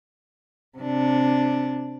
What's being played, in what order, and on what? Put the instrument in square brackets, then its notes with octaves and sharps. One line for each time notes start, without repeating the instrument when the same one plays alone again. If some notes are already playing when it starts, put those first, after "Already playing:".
[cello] C3 D4